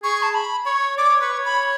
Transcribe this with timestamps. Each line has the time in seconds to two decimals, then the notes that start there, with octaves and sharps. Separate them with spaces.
0.03 G#4 C#6
0.23 A5
0.34 B5
0.65 C#5 C#6
0.98 D5 D6
1.09 C#5
1.21 B4 C#6
1.33 C#5
1.45 B5